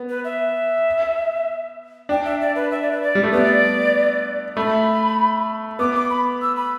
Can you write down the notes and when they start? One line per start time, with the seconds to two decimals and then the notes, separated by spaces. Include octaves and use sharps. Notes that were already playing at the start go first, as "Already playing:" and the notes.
Already playing: B3
0.09 B4
0.24 E5
2.09 D4 G5
2.25 E5
2.41 D5
2.55 B4
2.71 E5
2.82 D5
2.91 B4
3.02 D5
3.15 G3
3.24 A3
3.33 B3 D5
4.57 A3 B5
5.79 B3 D6
5.95 D6
6.10 B5
6.42 E6
6.56 B5